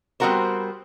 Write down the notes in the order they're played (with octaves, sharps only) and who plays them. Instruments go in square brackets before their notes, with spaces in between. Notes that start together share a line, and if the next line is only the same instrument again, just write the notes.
[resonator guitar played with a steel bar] G3 B3 C4 F#4 A#4 C5